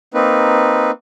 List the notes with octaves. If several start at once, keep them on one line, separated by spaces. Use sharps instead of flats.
A#3 C4 D#4 B4